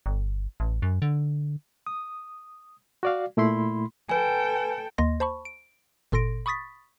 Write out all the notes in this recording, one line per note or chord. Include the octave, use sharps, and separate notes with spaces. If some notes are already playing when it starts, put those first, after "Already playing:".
G1
A1
F#2
D3
D#6
F#4 D5 F5
A#2 A3 E4 B5 C6
A4 B4 G5 G#5
D#2 A#3 D#5 C6 A#6
C5 A5 B5 C#6
D7
G1 A#2 A4 C6 A#6 D7
B5 C#6 D#6 A6 B6